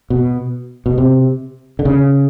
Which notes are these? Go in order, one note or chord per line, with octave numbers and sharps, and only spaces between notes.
B2
B2
C3
D3
C#3